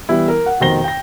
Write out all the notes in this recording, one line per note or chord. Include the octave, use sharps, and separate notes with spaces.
E3 G3 B3 E4
A#4
F#5
F1 B2 D#3 C5 A#6 G7
G5 A#6